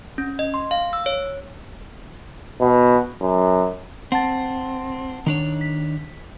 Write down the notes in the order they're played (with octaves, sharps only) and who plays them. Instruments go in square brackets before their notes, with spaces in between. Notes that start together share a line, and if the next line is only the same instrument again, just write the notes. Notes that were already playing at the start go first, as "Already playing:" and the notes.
[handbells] C#4
D#5
C6
F5
E6
C#5
[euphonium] B2
F#2
[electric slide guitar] C4 [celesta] F#5 A5 A6
[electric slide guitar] D#3 D4 C#5
[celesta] B6